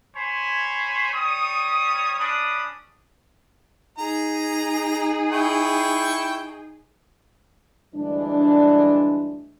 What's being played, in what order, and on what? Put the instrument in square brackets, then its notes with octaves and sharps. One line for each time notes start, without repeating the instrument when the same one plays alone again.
[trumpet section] C5 C#5 G#5 B5
G3 C#5 D#6
C#4 D4 B5 D#6
[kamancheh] D#4 G#4 [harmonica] A#5
[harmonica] E4 G5 C#6
[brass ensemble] D2 G2 E3 G#3 D4